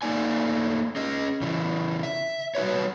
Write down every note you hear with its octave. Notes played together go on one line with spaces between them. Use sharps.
A3 A#3 D#4 D5 G#5
C#4 G#4 D#5
C#3 E3
E5
G3 F#4 B4 C#5